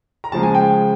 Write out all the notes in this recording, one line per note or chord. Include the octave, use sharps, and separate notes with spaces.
A#5
C#3 F3 G#3 A5
G#5
G5